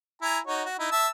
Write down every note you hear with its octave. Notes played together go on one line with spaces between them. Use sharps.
E4 G#5 A#5
D#4 F#4 C#5
F#4
D#4 E4
E5 A5 E6